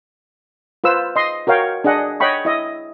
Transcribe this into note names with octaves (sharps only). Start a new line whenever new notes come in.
F4 B4 C5 E6
D#5 C6
F#4 A#4 C#5 F5 G5
D4 G#4 D#5 F#5
C#5 D#5 F#5 G5 B5 C#6
E4 D#5 E5